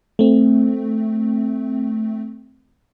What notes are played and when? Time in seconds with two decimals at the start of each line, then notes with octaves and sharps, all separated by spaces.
0.19 A3 C4